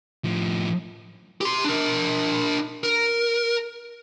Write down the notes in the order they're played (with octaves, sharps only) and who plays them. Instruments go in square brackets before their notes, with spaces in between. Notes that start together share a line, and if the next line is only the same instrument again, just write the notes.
[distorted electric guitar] A2 F3
[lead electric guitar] G4 C6
D4 A#4
A#4